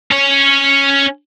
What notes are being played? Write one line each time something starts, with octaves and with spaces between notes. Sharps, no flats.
C#4 C#5